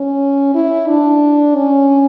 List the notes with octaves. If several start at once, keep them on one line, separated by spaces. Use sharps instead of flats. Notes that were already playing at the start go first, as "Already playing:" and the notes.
Already playing: C#4
E4
D4
C#4